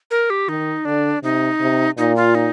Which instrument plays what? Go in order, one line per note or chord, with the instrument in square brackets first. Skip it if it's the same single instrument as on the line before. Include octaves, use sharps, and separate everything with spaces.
[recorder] A#4
G4
[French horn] D#3 [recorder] D#4
[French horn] D3 [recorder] D4
[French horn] C3 [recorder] D#4
[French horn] C3
[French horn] A#2 [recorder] D#4
[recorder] F4
D#4